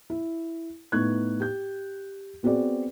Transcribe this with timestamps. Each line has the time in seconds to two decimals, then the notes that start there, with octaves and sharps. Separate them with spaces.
0.10 E4
0.92 A2 B3 D#4 C#6 F#6 G#6
1.40 G4 G6
2.43 B3 C4 F#4 G#4 D5